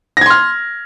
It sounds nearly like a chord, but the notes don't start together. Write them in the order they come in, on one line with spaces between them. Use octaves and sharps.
A#6 G#6 C6 F6